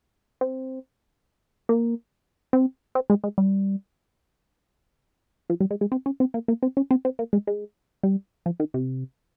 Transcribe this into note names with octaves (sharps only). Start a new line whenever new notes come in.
C4
A#3
C4
C4
G#3
G#3
G3
F3
G3
G#3
G#3
C4
C#4
C4
A#3
A#3
C4
C#4
C4
C4
A#3
G#3
G#3
G3
F3
D#3
C3